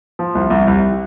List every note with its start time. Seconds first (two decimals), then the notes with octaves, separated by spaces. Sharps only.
0.19 F3
0.35 C2
0.50 C2
0.68 C2